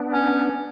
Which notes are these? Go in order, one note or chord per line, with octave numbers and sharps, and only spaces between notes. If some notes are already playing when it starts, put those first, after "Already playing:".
Already playing: B3 D4
C#4